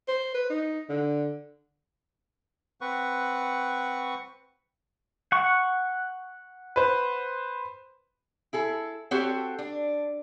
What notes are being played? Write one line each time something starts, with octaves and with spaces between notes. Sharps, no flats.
C5
B4
D#4
D3
C4 B4 F#5 C#6
F#5 C#6
B4 C5
E4 G#4 A4
C4 F#4 G4 A4 C5 C#5
D4